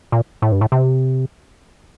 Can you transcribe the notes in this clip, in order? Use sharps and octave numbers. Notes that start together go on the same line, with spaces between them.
A#2
A2
G2
A2
C3